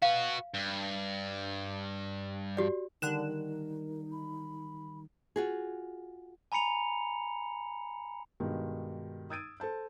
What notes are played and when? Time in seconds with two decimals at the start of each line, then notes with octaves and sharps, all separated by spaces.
0.02 F#4 B4 F5
0.54 G2
2.57 F#4 G4 D5
3.02 D3 D#3 G3 D#4 A#4 F#6 E7
4.12 B5
5.36 F4 F#4 G#4
6.52 G#5 A#5 B5 C#7 F7
8.40 G2 B2 D#3 G#3
9.30 D#6 E6 G#6 A6 D7 D#7
9.60 A4 C5 A5 G6